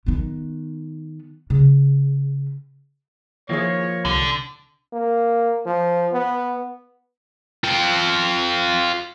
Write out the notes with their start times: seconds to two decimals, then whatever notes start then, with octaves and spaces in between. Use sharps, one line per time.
0.06 D#3 B3
1.50 C#3
3.49 D#3 F3 A#3 E4 G#4 C#5
4.05 C2 D3
4.93 A#3
5.66 F3
6.13 B3
7.64 F4 G5